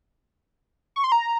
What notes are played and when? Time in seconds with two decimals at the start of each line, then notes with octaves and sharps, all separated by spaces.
0.96 C#6
1.04 C6
1.12 A#5